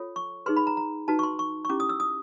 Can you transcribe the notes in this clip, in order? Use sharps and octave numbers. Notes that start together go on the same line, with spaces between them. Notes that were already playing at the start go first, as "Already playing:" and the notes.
Already playing: F4 A4 C#5
C#6
D#4 G#4 B4 C6
B5
A#5
A#5
D#4 F#4 B4 A5
C#6
C6
C#6
C#6
C#4 E4 G4 D6
D#6
E6
D#6